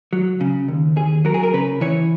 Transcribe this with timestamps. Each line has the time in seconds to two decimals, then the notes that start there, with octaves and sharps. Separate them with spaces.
0.13 F#3
0.41 C#3
0.68 D#2
0.96 D#2 G#4
1.25 F#3 A#4
1.34 G#4
1.43 A#4
1.53 C#3 B4
1.81 E3 C#5